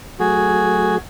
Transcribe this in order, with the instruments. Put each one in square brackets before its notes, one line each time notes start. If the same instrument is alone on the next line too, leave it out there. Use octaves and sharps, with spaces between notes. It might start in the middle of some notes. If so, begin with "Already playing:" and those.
[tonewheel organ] F#3 A3 [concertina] F#4 G#4